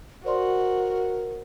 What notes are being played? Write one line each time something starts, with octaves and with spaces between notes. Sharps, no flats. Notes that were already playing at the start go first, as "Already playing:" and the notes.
F#4 A#4 C5 D5 C6